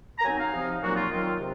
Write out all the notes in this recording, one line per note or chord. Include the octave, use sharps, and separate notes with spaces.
A#5
F#3 C4 D#4 G#5
F5
C3 F3 C4 D#4
A#2 F#3 A#3 D#4 F#4
F4
D#3 F#3 C4 F4
C3